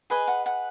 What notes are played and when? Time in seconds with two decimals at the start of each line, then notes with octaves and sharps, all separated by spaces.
0.10 G#4 B4 D#5 G#5
0.28 F#5
0.46 F#5